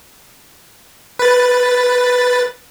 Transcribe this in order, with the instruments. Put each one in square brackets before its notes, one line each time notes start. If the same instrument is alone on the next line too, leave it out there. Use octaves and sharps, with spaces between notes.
[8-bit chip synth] B4 A6